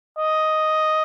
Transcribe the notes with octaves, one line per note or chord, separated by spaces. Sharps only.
D#5